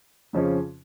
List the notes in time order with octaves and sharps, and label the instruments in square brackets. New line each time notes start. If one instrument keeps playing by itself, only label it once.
[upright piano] F2 C#3 F3 C#4